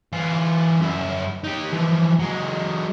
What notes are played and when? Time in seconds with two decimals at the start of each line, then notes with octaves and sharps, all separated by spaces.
0.13 E3 F4
0.80 F#2 E4
1.44 D#4 G4
1.72 E3 F3
2.19 F#3 G#3